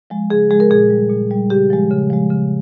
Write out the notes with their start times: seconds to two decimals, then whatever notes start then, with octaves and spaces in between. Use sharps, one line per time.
0.10 F3 G#3
0.30 C#3 G#4
0.50 F3 G#3 G#4
0.60 A#4
0.70 A#2 G#4
0.90 G3
1.10 A#2
1.31 G3
1.50 C#3 G4
1.70 F3 G#3
1.91 C#3
2.10 F3 G#3
2.30 C#3